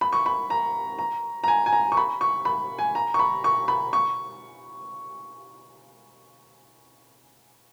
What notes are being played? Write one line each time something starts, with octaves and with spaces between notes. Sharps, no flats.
B5
C#6
B5
A#5
A#5
A#5
G#5
G#5
A#5
C#6
B5
C#6
B5
G#5
A#5
C#6
B5
C#6
B5
C#6